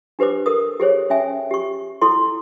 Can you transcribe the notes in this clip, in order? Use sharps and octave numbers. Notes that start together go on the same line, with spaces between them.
D4 G4 B4 C5 D6
A4 A#4 D#6
G4 G#4 C5 C#5
C#4 E5 G#5
G4 C#6
E4 A4 C6